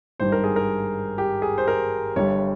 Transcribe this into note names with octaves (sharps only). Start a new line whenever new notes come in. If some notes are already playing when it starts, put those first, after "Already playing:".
G#1 G2 D#3 G3 C5
A#4
G#4
A#4
G4
G#4
C5
A#4
G1 G2 G3 C#5